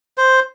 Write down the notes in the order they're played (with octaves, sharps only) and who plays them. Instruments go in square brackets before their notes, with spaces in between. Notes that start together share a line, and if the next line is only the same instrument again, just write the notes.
[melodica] C5